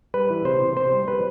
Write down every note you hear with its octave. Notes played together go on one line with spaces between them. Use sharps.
G3 B4
E3
C3 C5
C3
C3 C5
G3
G3 B4